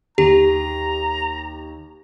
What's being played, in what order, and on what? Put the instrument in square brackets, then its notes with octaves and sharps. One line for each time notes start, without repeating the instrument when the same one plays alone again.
[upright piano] D#2 [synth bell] G4 [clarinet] A#5